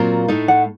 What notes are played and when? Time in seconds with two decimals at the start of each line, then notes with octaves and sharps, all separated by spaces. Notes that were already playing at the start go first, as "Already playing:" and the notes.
Already playing: A#2 F#3 C4 F4 A#4
0.28 A2 A3 D#4
0.48 F#5